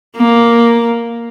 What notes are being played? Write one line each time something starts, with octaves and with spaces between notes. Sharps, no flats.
A#3